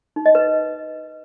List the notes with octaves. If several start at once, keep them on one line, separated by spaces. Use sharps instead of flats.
D#4
D#5
B4